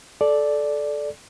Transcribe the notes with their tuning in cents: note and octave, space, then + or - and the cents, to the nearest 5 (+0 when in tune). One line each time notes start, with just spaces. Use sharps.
A4 -15 D5 +0